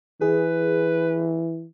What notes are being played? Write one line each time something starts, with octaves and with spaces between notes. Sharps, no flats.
E3 G#4 B4